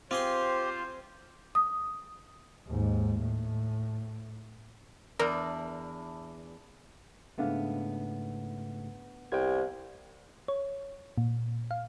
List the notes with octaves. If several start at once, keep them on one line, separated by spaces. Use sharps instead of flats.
C4 F4 G4 G#4 C5 C6
D#6
D#2 G#2
A2
E2 D4 A#4
G#2 C#3 A3 B3 D4 F5
C2 G5 G#6
C#5
A#2
F5